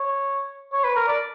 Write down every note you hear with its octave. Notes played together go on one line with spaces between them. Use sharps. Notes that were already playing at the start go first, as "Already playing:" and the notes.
Already playing: C#5
C#5
B4
A#4
D5